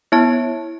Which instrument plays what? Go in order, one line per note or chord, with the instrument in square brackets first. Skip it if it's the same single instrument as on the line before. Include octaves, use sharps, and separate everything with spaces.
[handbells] B3 E4 C#5 E5 A5